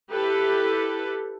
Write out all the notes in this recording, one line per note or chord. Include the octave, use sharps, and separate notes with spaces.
E4 G4 A4 B4